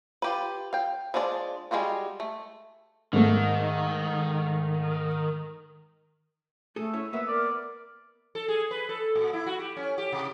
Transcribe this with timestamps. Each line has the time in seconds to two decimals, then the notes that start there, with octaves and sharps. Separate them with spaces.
0.22 F4 G4 B4
0.73 F5 G5
1.14 F3 G#3 D4 F4 D5
1.71 G3 G#3 B3 F4 F#4
2.20 A3
3.13 G#2 D#3 A3
6.76 A3 G#4 A4
6.93 C#4 E4 C#5
7.13 A#3 B3 B4 E5
7.28 A#4 D5
8.35 A4
8.48 G#4
8.71 B4
8.89 A4
9.15 A#2
9.33 E4
9.46 F#4
9.59 G4
9.77 C#4
9.98 G4
10.13 C3